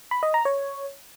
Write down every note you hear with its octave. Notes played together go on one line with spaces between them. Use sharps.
B5
D#5
A#5
C#5